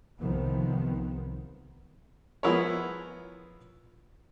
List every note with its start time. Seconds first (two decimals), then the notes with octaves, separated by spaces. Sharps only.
0.20 C2 C3 D#3 F3 B3
2.43 F3 B3 E4 G#4 A#4 C#5